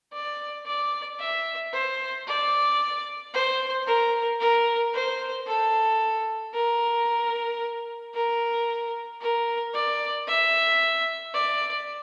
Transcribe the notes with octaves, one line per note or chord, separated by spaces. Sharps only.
D5
D5
E5
C5
D5
C5
A#4
A#4
C5
A4
A#4
A#4
A#4
D5
E5
D5